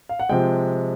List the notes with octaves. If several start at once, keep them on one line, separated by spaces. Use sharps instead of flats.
F5
F#5
C3 F3 G#3 G5